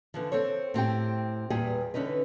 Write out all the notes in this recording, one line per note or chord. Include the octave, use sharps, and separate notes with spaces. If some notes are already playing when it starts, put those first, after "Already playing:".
D3 E3 F3
C4 A4 C5 C#5
A2 C4 G4 G5
E2 A#2 G3 G#4 B4 G5
D3 E3 C#4 D#4 B4